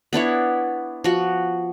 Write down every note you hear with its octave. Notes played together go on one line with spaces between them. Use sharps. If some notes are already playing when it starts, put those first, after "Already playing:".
B3 D4 E4 C#5
F3 F#4